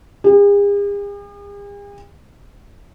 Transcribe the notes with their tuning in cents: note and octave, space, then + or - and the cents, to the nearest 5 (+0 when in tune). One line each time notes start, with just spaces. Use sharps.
G#4 -45